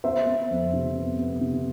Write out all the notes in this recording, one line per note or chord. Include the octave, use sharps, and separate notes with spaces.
B3 C5 E5
B3
F2
C3
B3
B3
C3